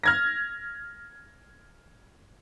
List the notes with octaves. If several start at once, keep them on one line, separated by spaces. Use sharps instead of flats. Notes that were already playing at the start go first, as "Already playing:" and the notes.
F6 G#6 A#6